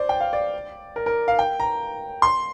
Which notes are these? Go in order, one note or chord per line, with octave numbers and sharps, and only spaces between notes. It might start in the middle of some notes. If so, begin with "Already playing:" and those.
Already playing: C5 D5
G5
F5
D5
A#4
A#4
F5
G5
A#5
C6